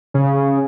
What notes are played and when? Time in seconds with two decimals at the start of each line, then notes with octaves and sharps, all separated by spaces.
0.14 C#3